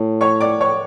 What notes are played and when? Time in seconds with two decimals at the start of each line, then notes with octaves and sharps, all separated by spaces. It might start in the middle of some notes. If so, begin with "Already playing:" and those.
Already playing: A2
0.21 C#5 C#6
0.40 D5 D6
0.60 C#5 C#6